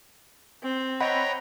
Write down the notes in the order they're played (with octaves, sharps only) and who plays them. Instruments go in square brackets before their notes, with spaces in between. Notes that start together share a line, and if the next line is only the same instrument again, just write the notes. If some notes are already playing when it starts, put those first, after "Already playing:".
[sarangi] C4
[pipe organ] C#5 G5 A#5 [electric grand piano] D#5 F#5 B5